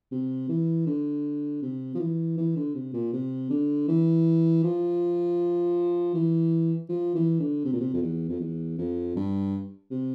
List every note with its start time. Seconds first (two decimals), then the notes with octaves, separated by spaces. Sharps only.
0.11 C3
0.49 E3
0.87 D3
1.62 C3
1.94 F3
1.99 E3
2.37 E3
2.56 D3
2.74 C3
2.94 A#2
3.13 C3
3.50 D3
3.88 E3
4.64 F3
6.14 E3
6.89 F3
7.15 E3
7.40 D3
7.65 C3
7.73 A#2
7.80 C3
7.93 F2
8.02 E2
8.29 F2
8.40 E2
8.78 F2
9.16 G2
9.91 C3